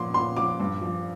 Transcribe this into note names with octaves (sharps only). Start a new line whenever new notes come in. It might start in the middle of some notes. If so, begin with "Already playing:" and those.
Already playing: A#2 F3 C6 D6
A#2 C6
F3 D6
G2
F3